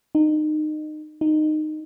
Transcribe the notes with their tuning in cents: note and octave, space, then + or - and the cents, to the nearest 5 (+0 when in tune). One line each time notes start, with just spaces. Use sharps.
D#4 -25
D#4 -15